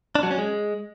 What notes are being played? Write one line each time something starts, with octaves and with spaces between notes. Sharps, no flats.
D4
F#3
C#4
G#3